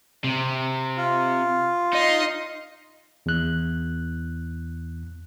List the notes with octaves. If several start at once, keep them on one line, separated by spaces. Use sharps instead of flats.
C3
F4
D#4 D#5 C6
E2 F#6